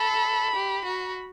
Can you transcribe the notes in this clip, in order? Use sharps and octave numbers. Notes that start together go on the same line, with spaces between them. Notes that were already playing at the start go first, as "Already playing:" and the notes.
Already playing: A4 B5
G4
F#4